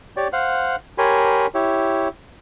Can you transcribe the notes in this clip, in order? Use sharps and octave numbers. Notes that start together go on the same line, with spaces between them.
G4 C#5 D5
C5 F5 F#5
G4 A#4 C#5 G#5 B5 C6
E4 G4 C#5